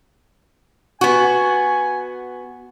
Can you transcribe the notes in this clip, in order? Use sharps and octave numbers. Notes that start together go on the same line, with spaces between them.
B3 F#4 G#5